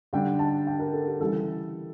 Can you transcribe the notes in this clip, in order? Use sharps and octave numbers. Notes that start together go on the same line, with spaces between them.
D3 G3 D4 G5
A5
G5
A#4
A4
G4
C#3 E3 G3 A4